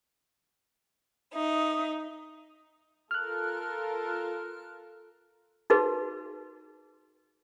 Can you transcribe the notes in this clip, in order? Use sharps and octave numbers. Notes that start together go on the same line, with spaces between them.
D#4 E5 D#6
F4 A4 A#4 F6 F#6
D#4 F#4 G#4 B4